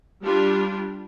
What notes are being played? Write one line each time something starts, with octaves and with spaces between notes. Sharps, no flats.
G3 D4 F4 G4